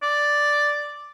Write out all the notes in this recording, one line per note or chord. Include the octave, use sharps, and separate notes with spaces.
D5